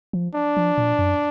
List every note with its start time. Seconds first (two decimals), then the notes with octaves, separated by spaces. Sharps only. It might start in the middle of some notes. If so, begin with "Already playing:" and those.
0.13 F3
0.35 D4
0.57 F3
0.78 A#2
0.99 F#2